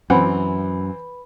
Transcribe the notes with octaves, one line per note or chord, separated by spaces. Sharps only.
F#2 E3 C4 B4 F#5 B5